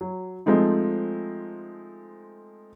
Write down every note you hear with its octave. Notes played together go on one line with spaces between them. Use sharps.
F#3
F3 G#3 A3 C4 D#4